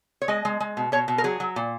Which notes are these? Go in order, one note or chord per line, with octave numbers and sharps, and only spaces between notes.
C#5
G#3 D#5
G#3
G#3
B2
B2 C#5
B2
A#4
F#3 G#4
F#3
A#2